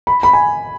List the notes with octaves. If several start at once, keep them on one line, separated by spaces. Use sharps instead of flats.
B5
B5
G#5